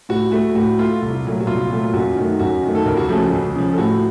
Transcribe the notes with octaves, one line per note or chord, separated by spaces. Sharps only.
A2 F#4
A3 F#4
A2 F#4
A3 F4
C2
A#2 F#3 A3
F#4
C2 F4
A#2 F#3 A3
F4
F#2 F#4
D#3 A3
F#2 F#4
D#3 A3
A4
C#2 A#3 A#4
F#4
C#3 F3 A3 A4
F#4
C#2
C#3 F3
A4
A2 F#4